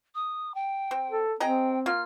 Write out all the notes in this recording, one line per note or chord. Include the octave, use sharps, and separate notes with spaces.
D#6
G5
C4
A4
C4 G#4 D#5 G5 A#5
A#3 F4 F6